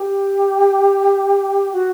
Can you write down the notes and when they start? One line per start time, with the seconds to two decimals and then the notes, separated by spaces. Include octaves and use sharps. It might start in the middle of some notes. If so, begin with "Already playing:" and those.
Already playing: G4
1.72 F#4